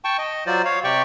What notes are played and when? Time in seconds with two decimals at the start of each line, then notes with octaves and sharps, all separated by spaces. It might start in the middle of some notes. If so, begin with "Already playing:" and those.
0.04 G5 A5 C#6
0.18 D#5
0.47 F#3 F4 C5 D5
0.65 C#5 F5
0.84 C3 G4 D5 G5 C#6